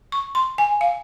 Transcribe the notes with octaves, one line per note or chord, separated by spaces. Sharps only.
C#6
C6
G#5
F5